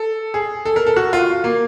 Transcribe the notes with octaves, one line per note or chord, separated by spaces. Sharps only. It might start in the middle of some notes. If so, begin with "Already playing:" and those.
Already playing: A4
G#4
A4
A#4
A4
F#4
F4
A#3